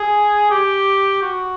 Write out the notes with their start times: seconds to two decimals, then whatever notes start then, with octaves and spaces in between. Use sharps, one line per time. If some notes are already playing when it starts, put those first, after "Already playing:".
Already playing: G#4
0.51 G4
1.22 F#4